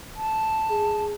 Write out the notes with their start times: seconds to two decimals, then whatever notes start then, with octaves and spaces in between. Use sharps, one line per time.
0.16 A5
0.71 G#4